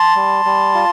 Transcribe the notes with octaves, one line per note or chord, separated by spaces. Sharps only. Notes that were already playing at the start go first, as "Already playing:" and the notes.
Already playing: A5 C6
G3
G3
F4